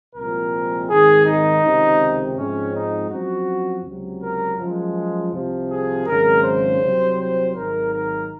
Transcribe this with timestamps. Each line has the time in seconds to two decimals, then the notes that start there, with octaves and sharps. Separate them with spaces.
0.15 C2 A#2 F3 G#3 C4 A#4
0.89 G#1 G#2 D#3 G#4
1.26 D#4
1.63 C#2 C3 D#3
2.36 G#2 F3 G#3 C4 C#4
2.74 D#4
3.10 F#2 F3 C4 F#4
3.85 C#2 C3 F#3
4.22 A#4
4.58 F#2 F3 G#3
5.33 C2 C3 F3
5.70 G#4
6.06 G#1 F#2 C#3 G#3 A#4
6.44 C5
6.80 C2 C3 F#3 C4
7.17 C5
7.54 G#1 G#2 D#3 F#3 A#4
7.92 A#4